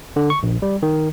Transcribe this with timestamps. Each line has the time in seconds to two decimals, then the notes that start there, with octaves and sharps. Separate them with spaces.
0.16 D3
0.30 C#6
0.43 A#1
0.62 G3
0.83 D#3